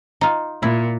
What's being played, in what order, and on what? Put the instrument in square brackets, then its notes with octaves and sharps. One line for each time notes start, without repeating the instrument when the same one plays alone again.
[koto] D#4 F4
[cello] A#2 [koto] E4